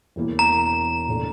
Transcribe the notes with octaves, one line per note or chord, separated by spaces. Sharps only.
E1 E2 E3 A#3
A#5
A#2 A3 D4